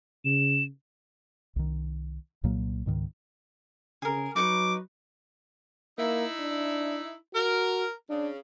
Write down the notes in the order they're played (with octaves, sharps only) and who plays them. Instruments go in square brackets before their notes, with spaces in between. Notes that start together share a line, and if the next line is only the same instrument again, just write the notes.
[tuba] C#3 [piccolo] E7
[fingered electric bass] C2 D#3
C2 A#2 F#3 A#3
C#2 G#2 D#3
[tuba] C#3 [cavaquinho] G#4 A#4
[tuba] F#3 [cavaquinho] D#4 B4 C#6 [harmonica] D6
[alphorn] A#3 [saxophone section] D#4 E4
[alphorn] D4
[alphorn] F#4 [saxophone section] A#4
[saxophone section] C#3 [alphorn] D4